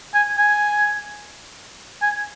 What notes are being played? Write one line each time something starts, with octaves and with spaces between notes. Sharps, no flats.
G#5
G#5
G#5